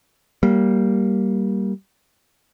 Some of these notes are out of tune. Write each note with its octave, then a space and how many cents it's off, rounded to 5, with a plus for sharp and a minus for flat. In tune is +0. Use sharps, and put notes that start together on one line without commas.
G3 -10 A#3 +0